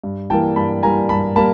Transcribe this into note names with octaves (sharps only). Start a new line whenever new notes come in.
G2
E3 G3 A#3 G5 A5
G2 A5 B5
E3 G3 A#3 G#5 A#5
G2 A5 B5
G3 A#3 A5 B5